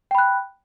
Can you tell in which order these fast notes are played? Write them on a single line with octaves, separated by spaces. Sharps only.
G5 B5 F#6